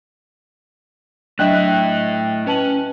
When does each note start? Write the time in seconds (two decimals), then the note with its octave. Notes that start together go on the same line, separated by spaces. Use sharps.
1.39 F#3 A3 D4 E4 D#5 E5 G5 F#6
2.47 C#4 B4 A5 F#7